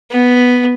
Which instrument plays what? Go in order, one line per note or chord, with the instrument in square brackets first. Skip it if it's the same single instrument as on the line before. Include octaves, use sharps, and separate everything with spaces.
[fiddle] B3